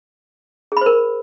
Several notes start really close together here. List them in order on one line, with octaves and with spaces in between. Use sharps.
G#4 B5 C5 A#4